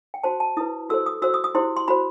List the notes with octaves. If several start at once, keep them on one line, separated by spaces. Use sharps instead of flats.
G5
F#4 C5 A5
A5
E4 B4 D#6
F#4 A4 C5 E6
D#6
F#4 C5 E6
D#6
D#6
E4 G4 C5 C6
C6
F#4 C5 B5